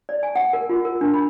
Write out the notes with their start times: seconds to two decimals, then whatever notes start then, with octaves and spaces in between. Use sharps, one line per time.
0.09 D5
0.23 G#5
0.36 F#5
0.53 A#4
0.69 F4
0.85 A#4
1.01 D4
1.14 B5